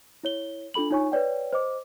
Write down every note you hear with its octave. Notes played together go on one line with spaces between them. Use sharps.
E4 C#5 G7
D4 F4 A4 B5 F#7
D#4 F4 C#5 G#5 C#6
B4 C#5 D5 G5
C5 D#5 D6